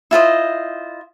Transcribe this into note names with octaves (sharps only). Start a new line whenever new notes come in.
E4 F4 C5 D#5